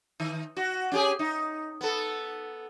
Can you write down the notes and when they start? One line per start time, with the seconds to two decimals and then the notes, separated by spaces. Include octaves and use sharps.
0.20 D#3
0.57 F#4
0.92 C#4 G4 G#4
1.19 D#4
1.81 B3 A4